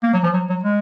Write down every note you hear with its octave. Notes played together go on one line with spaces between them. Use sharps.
A#3
F#3
F3
F#3
F#3
G#3